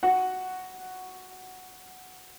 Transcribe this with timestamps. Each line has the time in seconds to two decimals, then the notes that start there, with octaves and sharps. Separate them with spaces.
0.03 F#4 F#5